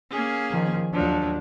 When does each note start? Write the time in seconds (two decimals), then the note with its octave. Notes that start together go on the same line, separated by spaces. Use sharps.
0.11 A#3 C#4 G#4
0.51 D#3 F3
0.93 D#2 F3 F#3 D4